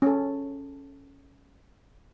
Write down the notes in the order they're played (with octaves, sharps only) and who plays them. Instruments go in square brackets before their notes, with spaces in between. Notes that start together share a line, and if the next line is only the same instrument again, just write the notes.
[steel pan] C#4 A4